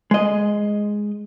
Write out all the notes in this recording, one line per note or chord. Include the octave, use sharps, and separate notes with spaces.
G#3 D#5